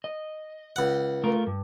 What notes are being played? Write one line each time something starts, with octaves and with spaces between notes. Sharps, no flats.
D#5
C#2 F#5
A3 F4 A#4
G2